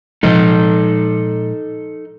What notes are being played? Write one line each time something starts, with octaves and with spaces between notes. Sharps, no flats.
A#2 F3 G#3 D#4 A4 D#5